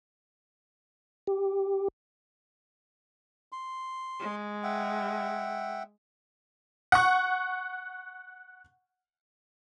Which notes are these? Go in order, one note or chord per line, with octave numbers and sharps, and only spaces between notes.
G4
C6
G#3
E5 F#5 G5
F#5 C#6